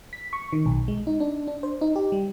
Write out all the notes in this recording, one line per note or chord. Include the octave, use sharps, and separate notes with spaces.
B6
C#6
D#3
B1
G#3
D#4
D4
D4
C5
D#4
G4
G3